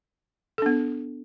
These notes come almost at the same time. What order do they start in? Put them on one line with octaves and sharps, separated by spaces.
A4 D4 B3